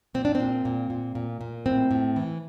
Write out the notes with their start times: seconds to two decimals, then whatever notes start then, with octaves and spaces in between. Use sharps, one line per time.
0.14 A#2 C4
0.25 D4
0.35 C4
0.40 A#2
0.65 A#2
0.90 A#2
1.15 A#2
1.41 A#2
1.66 A2 C4
1.91 A2
2.16 E3